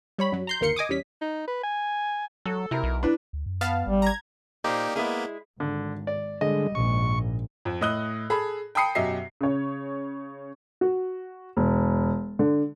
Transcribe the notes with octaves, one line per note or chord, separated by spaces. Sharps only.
G3 C#5 B5
F#2 F#3
A#5 C6 G6
G1 D#2 A#3 A#4 C6 C#7
D#5 G#5 D6 D#6
E2 G3 C#4 B6
D#4
B4
G#5
F#3 A4
C3 E4 A#4
B1
D4 E4 B4
D2
F#2
B3 F5 A5
G#1 G3
A#5 G#6
A#2 A#3 D#4 G4 C5 D5
G#3 A#3 B3 E4 G#4
G#1 D3
D5
D3 G3 G#3 D#5
A#1 G#2 C#6
F2
A2 D#5 D#6 F#6 G7
G#4 A4 B5
G5 A5 B5 D#6 C7 C#7
F#2 B2 G4 D#5 E5 C7
C#3 C#5
F#4
E1
D3